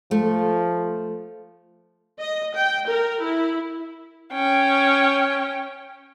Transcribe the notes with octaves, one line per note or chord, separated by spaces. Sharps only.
F3 A3
D#5
G5
A#4
E4
C#4 G5